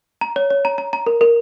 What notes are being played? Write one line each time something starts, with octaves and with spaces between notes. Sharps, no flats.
A#5
C#5
C#5
A#5
A#5
A#5
A#4
A#4